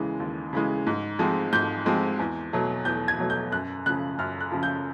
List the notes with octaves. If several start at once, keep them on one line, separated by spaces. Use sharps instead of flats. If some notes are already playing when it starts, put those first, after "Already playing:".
Already playing: D#2 C#3 E3 G#3
D#2
C#3 E3 G#3
G#2
F3 G#3 C4
G#2 G6
F3 G#3 C4
E2
B2 F#3 A3
E2 G6
G#6
B2 F#3 A3
G6
F#2 F#6
C#3 F3 F#6
F#2 F6
F#6
C#3 F3
G6